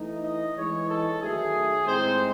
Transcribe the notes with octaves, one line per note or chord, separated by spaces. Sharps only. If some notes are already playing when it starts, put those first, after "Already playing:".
Already playing: E3 A3 D#4
D#5
E3 G#3 D#4 C#5
A4
D#3 F#3 A3 G#4
A2 G#3 C4 D#4 C5